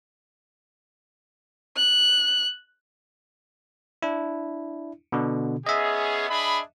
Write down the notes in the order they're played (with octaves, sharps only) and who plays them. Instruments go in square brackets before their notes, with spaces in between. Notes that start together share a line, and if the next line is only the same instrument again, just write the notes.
[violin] F#6
[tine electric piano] D4 E4
B2 D3
[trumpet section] B3 C#4 G#4 [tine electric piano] D#5 E5
[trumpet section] D4 G#4 B5